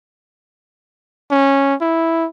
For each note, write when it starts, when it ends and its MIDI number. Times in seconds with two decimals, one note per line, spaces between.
1.31 1.75 61
1.81 2.26 64